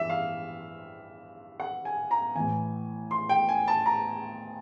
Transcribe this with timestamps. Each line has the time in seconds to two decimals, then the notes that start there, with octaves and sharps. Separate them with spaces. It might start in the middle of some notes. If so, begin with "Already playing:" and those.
Already playing: G2 E3 E5
0.10 F5
1.60 F#5
1.85 G#5
2.11 A#5
2.35 A2 E3 G#5
3.11 C6
3.29 G5
3.49 G#5
3.68 A5
3.86 A#5